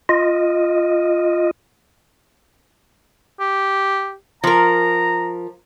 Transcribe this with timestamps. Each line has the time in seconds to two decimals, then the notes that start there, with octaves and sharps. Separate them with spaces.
0.09 F4 D#5
3.40 G4
4.44 F3 A#4 A#5